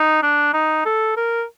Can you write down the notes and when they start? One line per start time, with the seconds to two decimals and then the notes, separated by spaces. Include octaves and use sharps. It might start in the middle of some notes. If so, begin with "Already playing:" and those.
Already playing: D#4
0.23 D4
0.54 D#4
0.86 A4
1.17 A#4